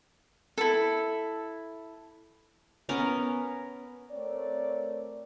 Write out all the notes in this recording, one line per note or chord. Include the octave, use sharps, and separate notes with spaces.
E4 A4
B3 C#4 A#4 A#5
A3 C4 A#4 C#5 D5